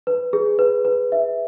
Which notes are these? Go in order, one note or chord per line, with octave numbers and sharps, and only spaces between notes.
B4
G#4
B4
B4
E5